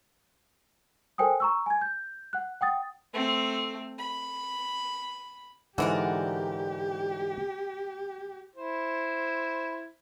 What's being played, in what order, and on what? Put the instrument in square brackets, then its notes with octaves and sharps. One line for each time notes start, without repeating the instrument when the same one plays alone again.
[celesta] A4 A#4 C5 G5 G#5 D#6
A#5 C#6 E6
G#5 G#6
G6
F#5 F#6
F#5 G5 D#6 A6
[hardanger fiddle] A3 C4
B5
[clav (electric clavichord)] G#2 D3 E3 [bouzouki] F#4 A#4 D5 [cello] G4
[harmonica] E4 C5